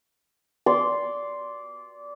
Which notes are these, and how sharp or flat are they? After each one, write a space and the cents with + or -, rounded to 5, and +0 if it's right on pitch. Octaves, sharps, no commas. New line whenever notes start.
D5 -20 C6 +0